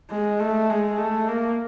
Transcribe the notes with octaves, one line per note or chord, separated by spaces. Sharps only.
G#3
A3
G#3
A3
A#3